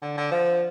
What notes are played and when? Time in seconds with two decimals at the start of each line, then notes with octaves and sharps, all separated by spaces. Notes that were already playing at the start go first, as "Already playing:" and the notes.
0.02 D3
0.17 D3
0.31 F3